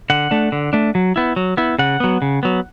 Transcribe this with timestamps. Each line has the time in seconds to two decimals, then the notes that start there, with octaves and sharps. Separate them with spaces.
0.10 D3 F#5
0.31 A3 D4
0.52 D3
0.73 A3 D4
0.95 F#3
1.16 B3 E4
1.36 F#3
1.57 B3 E4
1.79 C#3 F#5
2.00 F#3 B3
2.22 C#3
2.43 F#3 B3